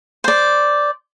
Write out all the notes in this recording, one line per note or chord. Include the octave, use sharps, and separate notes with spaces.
C5 D5